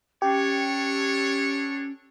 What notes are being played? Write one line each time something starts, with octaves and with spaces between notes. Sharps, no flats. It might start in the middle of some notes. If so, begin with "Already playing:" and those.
C#4 D4 G4 A4 C#5